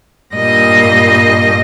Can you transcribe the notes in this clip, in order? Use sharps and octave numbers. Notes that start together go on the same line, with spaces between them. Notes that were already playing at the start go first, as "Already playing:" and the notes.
G2 A#2 G3 D#5 A#6